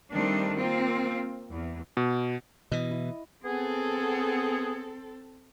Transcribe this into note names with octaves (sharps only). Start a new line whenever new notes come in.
D#3 G3 A3 C4 D4
A#3 C4 F4
E2
B2
B2 E3 D#5
E4
B3 C4 G#4 A4